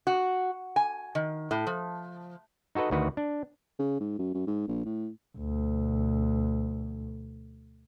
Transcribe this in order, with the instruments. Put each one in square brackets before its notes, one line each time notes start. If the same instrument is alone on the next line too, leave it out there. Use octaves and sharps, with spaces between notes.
[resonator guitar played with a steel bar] F#4
G#5
D#3
A2
F3
[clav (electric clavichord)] D#4 F#4 A4 B4 D#5
D2 D#3 F#4 B4
D4
[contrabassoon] C#3
G#2
F#2
F#2
G#2
A#1
A2
[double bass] D2 B2